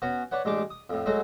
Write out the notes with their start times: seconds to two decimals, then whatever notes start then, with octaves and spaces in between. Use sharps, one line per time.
0.02 B3 C#4 F#4
0.31 D4 B4 C#5 F#5
0.45 A1 G#3 A3 D4 D6
0.70 D#6
0.90 F2 A2
1.06 F#3 G#3 A3 F#4